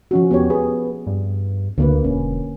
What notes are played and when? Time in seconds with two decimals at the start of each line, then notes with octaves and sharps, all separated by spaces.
0.11 F3 C#4 F#4
0.31 E2 B3 G4 C#5
0.50 B3 G#4
1.07 G2
1.78 D2 D3 A#3 B4
2.04 E1 C#4